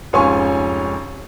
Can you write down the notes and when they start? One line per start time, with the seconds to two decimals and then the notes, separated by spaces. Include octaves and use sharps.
0.13 F1 G#2 C#4 F4 G#5 C#6